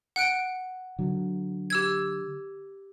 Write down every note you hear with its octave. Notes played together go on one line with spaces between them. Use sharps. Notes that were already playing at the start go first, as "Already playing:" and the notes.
F#5 F#6 D7
D3 F#3
G4 E6 G#6